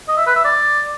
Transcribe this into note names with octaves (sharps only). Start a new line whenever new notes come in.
D#5
E5
B4
E5
D5